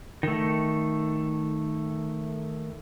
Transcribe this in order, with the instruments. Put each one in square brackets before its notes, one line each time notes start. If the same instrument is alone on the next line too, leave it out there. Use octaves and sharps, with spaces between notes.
[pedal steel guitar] D#3 A3